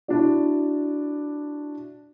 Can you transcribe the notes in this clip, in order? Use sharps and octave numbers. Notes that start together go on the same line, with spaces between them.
D4 E4 F#4 D5